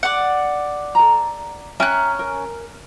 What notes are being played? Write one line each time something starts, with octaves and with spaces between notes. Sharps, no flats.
D5 F#5
A4 A#5
C#4 E5 G5 A#5 F#6
A#4